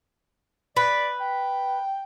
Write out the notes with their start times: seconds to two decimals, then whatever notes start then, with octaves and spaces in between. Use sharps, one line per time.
0.77 B4 D5
1.20 G5